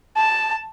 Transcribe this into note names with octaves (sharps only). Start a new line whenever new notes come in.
A5